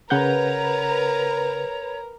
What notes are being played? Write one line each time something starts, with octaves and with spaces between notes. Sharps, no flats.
C#3 A#4 B4 C#5 F#5 A#5 G6